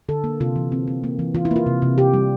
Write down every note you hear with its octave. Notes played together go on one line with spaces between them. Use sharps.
D3 A4
A#3
C3 F4
E3
C4
C4
A#3
E3
E3 F4
E4
A#3 F4
C3
C3
C3 G4
G3